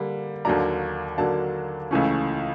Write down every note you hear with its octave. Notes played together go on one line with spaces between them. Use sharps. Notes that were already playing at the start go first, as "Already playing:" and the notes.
Already playing: D3 G3 A#3
D#2 D3 F#3 A#3 D4 A#5
D#2 D3 F#3 A#3 D4 A5
C#2 C#3 E3 A3 C#4